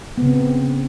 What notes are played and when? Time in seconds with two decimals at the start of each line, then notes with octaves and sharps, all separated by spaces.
0.18 B3
0.22 C#3
0.26 C4